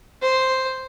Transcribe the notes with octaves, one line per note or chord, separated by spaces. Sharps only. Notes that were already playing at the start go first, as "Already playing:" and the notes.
C5